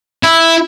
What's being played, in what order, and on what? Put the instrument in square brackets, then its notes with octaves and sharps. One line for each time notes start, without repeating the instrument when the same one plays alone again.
[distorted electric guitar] E4